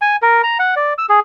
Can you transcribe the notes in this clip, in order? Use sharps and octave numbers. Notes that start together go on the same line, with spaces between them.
G#5
A#4
A#5
F#5
D5
E6
G#4